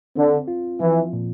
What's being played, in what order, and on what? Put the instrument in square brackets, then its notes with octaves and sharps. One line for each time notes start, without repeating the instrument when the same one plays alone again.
[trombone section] D3 [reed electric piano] C4
[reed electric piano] F4
[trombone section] E3 [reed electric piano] F3
[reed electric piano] A#2